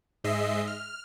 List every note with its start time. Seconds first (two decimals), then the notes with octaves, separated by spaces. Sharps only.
0.24 G#2 G#3 D#5 E5 C7
0.67 F6